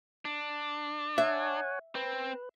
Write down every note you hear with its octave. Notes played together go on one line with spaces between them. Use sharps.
D4
C#5 E5 F#5 G#5
C4 B4